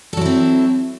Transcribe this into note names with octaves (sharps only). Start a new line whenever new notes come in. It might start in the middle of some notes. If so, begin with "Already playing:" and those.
F#3 C4 E4 A4